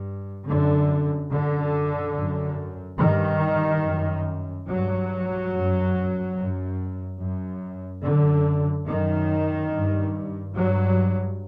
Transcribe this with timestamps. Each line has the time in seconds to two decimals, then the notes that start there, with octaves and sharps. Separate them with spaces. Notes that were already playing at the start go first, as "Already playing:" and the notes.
Already playing: G2
0.49 F#2 D3
1.33 F#2 D3
2.17 F#2
3.00 G2 D#3
3.84 F#2
4.68 G2 F#3
5.52 F#2
6.37 F#2
7.20 F#2
8.03 F#2 D3
8.87 F#2 D#3
9.72 G2
10.55 G2 F#3